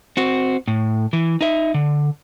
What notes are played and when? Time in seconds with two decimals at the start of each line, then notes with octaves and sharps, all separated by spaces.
0.17 C4 F#4
0.68 A2
1.13 E3
1.41 D#4 E5
1.74 D3